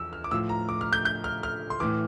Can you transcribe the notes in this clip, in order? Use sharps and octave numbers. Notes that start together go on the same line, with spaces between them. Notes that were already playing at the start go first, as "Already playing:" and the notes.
Already playing: E2 F3 E6
F6
D6
A2 F3 E6
A#5
D6
F6
G6
G6
F6
F6
C6
A2 E3 D6